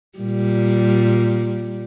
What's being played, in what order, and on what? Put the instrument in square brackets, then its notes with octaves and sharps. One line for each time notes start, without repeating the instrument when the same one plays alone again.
[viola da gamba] A#2 G3